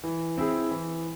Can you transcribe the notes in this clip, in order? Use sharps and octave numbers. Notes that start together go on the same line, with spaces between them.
E3
C4 E4 G#4
E3